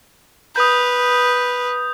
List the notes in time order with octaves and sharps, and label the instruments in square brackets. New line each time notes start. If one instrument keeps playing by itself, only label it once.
[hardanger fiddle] B4 [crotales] D#6 G6